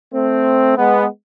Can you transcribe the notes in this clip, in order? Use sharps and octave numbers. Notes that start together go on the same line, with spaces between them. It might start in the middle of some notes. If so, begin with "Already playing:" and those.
A3 C4
G#3 B3